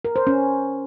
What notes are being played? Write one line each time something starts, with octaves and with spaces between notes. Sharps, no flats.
A#4
C5
C#4